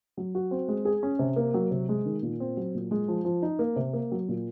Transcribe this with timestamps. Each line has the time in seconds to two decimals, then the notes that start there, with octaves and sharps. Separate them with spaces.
0.17 F#3
0.35 F#4
0.51 C4
0.68 G#3
0.85 G#4
1.03 C#4
1.19 C3
1.36 A#3
1.54 F#3
1.71 C3
1.89 G#3
2.06 D#3
2.23 A#2
2.40 C4
2.57 F#3
2.75 A#2
2.91 G#3
3.08 F3
3.25 F3
3.43 D#4
3.59 A#3
3.76 C3
3.93 A#3
4.12 F#3
4.28 A#2